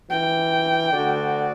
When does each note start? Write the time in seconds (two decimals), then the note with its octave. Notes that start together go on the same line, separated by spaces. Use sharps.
0.11 E3 G5
0.93 D2 D3 F#4 D5